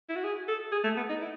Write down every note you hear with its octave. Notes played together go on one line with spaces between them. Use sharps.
E4
F#4
G#4
A4
G#4
A3
B3
D#4
E4